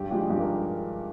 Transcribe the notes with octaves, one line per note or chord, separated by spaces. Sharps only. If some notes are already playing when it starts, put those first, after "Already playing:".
Already playing: G2 G4
F3 G#3 G4
G2 G4
A#4